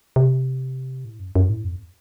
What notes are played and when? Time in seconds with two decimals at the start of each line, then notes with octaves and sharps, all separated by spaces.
0.16 C3
1.05 A2
1.20 F#2
1.35 F#2
1.50 A2
1.64 F2